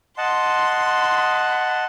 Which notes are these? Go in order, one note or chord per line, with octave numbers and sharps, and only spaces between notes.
D#5 F#5 A5 C6